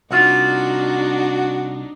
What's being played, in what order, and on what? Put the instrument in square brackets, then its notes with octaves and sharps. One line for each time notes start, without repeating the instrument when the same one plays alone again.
[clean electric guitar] C2 F4 [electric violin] D4 D#4 [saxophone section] F#4